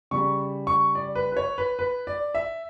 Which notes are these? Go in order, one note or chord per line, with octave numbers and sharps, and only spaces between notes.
C#3 G3 C#6
C#6
D5
B4
B4
C#5
B4
B4
D5
E5